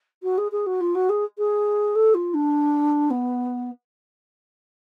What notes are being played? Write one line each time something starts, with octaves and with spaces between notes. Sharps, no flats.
F#4
G#4
G#4
F#4
F4
F#4
G#4
G#4
A4
F4
D4
B3